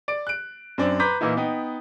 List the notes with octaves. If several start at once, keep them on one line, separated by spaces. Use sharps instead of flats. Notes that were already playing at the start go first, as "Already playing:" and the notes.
D5 D7
F#6 D7
F#2 C4 D4
B4 A#5 C6 D6 G6 B6
A#2 E3 A#3 D#4 E4
B3 D#4 G5